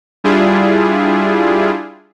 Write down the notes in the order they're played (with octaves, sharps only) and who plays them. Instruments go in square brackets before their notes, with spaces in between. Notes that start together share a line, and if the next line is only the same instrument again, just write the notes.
[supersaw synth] G3 D4 E4 F4 G#4